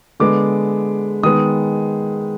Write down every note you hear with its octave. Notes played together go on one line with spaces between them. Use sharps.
D3 G#3 B3 D6
D#3 G#3 B3 D#6